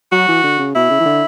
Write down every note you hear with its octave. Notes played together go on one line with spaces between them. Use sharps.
F#3 F#4
E3
D3
C#3
B2 E4
C#3
E3
D3